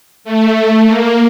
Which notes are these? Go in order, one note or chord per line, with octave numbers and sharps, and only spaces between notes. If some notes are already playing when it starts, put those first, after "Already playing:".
A3
A3
A#3